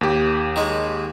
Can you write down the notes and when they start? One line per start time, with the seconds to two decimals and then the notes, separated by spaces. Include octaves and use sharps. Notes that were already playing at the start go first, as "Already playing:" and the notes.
0.01 D#2 G4
0.56 D#3 G#3